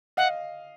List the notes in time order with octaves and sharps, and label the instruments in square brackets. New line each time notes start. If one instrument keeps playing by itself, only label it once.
[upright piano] D#5 F5 [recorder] F#5